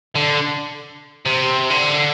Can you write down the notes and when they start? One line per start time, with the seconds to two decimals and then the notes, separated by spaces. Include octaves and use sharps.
0.16 D3
1.26 C3
1.70 D3